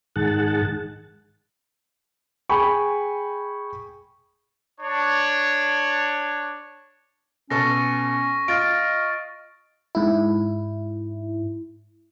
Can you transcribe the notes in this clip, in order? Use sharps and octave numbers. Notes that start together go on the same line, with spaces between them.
G#2 D#3 G#4 F#5 A5
G#4 G5 G#5 B5 C#6
D4 C#5
B2 C#4 A4 C#6 A#6
F4 D#5 F6 A6 D7
G#2 E4